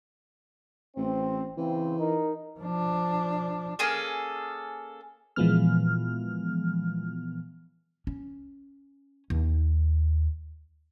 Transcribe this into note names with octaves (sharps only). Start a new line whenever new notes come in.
A1 C4
C#3 E3 C4
D#4 A#4
F3 D4
A#3 C#4 G#4 A4
A#2 E3 F3 G#3 B3 F6
C#4
D#2